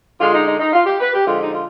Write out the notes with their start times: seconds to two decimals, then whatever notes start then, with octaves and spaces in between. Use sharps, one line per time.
0.19 D3 G#3 F4
0.33 D#4
0.47 D#4
0.59 D#4
0.73 F4
0.86 G4
1.00 B4
1.13 G4
1.26 D3 F3 G#3 F4
1.40 D#4
1.54 F4